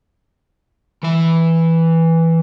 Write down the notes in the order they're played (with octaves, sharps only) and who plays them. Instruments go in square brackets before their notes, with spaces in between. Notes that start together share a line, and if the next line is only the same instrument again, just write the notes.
[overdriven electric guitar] E3 E5